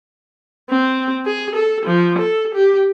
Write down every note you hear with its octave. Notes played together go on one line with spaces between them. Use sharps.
C4
G#4
A4
F3
A4
G4